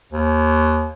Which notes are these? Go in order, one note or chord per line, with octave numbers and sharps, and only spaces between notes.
D#2